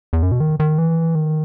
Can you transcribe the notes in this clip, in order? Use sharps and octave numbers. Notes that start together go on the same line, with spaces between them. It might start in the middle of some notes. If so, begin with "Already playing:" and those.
E2
F#2
B2
D#3
D#3
E3
D#3